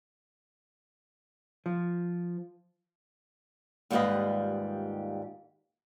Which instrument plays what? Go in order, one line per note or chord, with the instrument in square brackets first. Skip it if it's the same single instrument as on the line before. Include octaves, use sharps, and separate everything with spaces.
[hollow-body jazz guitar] F3
[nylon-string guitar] D#2 G#2 G3 F4 B4 D#5